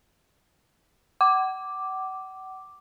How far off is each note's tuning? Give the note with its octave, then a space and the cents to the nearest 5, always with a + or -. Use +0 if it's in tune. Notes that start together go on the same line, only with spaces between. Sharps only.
F#5 +35 D6 +0